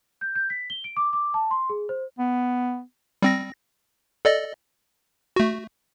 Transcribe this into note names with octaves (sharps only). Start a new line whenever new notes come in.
G6
G6
B6
G7
D7
D6
D6
A5
C6
G#4
C5
B3
G3 C4 A#6
A4 D5 D#5
A3 F#4